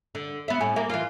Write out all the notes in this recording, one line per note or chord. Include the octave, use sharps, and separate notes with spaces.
D3
B3 E5
A2 G#5
A#3 E5
E3 F4